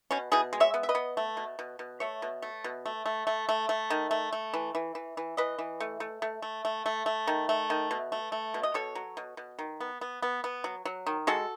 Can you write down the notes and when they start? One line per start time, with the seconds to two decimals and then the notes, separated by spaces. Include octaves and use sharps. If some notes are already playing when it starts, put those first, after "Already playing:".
0.11 B2 C#4
0.32 B2 E4 G#4
0.53 G#3
0.60 C#5 E5
0.74 B3
0.83 E5
0.89 B4 D#5
0.95 B3
1.17 A3
1.37 B2
1.59 B2
1.79 B2
2.00 A3 C#5 E5
2.22 B2
2.42 A3
2.64 B2
2.86 A3
3.06 A3
3.27 A3
3.49 A3
3.69 A3
3.90 D#3
4.11 A3
4.33 A3
4.54 E3
4.75 E3
4.95 E3
5.17 E3
5.37 E3 B4 D#5
5.59 E3
5.80 A3
6.00 A3
6.22 A3
6.42 A3
6.65 A3
6.86 A3
7.06 A3
7.27 D#3
7.49 A3
7.70 D#3
7.91 B2
8.12 A3
8.32 A3
8.54 B2
8.63 D#5
8.74 B2 A4 C#5
8.95 F#3
9.17 B2
9.37 B2
9.59 D#3
9.80 B3
10.01 B3
10.22 B3
10.44 B3
10.64 F#3
10.85 F#3
11.07 D#3
11.27 G#3 F#4 A4